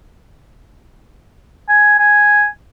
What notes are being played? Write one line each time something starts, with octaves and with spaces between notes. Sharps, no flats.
G#5
G#5